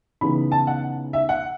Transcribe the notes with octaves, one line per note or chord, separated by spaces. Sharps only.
C#3 E3 B3 D#4 B5
A5
F#5
E5
F#5